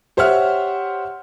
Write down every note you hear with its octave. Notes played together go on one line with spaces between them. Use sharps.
G4 C5 C#5 E5 F#5 F6